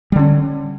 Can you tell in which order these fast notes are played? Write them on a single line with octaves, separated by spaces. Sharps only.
G3 D3 C#4